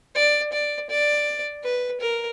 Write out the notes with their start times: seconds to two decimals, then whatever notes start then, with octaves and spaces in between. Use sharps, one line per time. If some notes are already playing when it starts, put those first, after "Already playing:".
0.15 D5
0.52 D5
0.90 D5
1.64 B4
2.01 A#4